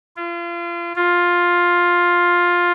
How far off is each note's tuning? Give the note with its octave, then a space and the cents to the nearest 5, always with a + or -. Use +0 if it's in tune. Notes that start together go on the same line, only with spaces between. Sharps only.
F4 -30
F4 +10